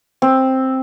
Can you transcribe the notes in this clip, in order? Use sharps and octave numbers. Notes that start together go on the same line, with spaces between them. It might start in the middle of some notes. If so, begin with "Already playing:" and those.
C4